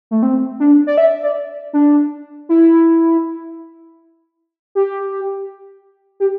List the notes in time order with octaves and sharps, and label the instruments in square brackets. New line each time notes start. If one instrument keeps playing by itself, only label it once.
[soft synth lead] A3
C4
D4
D5
E5
D5
D4
E4
G4
G4